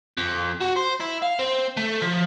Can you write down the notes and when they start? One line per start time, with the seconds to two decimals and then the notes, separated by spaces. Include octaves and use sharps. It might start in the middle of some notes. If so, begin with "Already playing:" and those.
0.18 F2
0.60 F#4
0.76 C5
1.00 E4
1.22 F5
1.39 C4
1.77 A3
2.02 F3